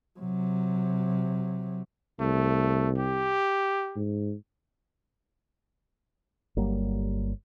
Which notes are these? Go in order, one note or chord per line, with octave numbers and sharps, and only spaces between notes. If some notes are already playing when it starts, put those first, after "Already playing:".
C3 F#3
C2 A3
G4
G#2
G1 F#3 G3 A#3